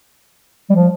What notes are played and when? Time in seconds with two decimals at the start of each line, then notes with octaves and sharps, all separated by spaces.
0.70 G3
0.75 F3